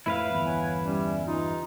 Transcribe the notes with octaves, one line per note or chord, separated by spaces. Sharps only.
F2 A2 E4 B4 F5
G1 E2
C#5 F#5 G#5
G3 C#4
C3 E3 D#4 F4